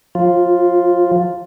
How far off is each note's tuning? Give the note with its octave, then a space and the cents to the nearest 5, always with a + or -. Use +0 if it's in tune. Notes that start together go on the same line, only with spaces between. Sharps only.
F3 +40 F4 +0